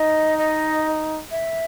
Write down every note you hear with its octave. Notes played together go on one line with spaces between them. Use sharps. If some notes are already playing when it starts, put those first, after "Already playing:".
Already playing: D#4 D#5
D#5
E5